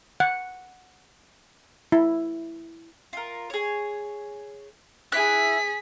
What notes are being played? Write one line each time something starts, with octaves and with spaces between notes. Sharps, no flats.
F#5
E4
F4 A#4
G#4 C#5
E4 G#4 F#6 B6